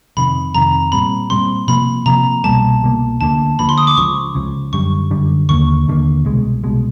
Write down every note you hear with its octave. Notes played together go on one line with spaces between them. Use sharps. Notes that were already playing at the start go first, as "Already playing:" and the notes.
F2 C3 D#3 B5
F2 C3 D#3 A#5
A#2 G3 C4 B5
A#2 G3 C4 C6
C3 F3 A#3 B5
C3 F3 A#3 A#5
C2 B2 G3 A#3 A5
C2 B2 G3 A#3
D2 D3 F3 A#3 A5
D2 D3 F3 A#3 B5
C6
D#6
D6
C#2 C#3 F3 C#6
C#2 C#3 F3
F#2 D3 G3 C#6
F#2 D3 G3
D#2 D3 G3 A#3 C#6
D#2 D3 G3 A#3
C2 B2 G#3
C2 B2 G#3